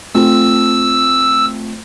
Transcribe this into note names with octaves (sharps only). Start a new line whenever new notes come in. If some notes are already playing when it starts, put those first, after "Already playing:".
A3 C4 F4 E6